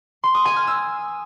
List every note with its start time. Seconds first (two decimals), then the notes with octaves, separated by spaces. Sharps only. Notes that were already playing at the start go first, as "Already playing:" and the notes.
0.24 C6
0.35 D#6
0.45 G#5
0.56 F6
0.67 E6